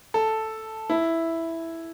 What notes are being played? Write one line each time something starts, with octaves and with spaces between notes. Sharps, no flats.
A4
E4